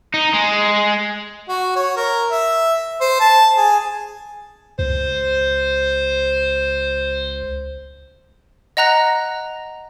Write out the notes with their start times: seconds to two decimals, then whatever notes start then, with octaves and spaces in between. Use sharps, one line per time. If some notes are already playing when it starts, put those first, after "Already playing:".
0.14 D#4
0.34 G#3
1.49 F#4
1.76 C#5
1.97 A#4
2.31 E5
3.01 C5
3.20 A5
3.57 G#4
4.79 C#2 C5
8.77 D#5 F#5 A#5 F#6 A#6